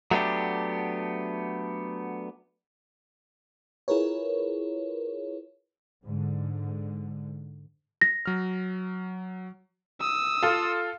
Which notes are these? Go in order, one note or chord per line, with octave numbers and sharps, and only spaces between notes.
F#3 A3 B3 D4 G4
E4 F4 G#4 A#4 B4 C#5
G#2 D3
A#6
F#3 F6
D#6 E6
F4 A4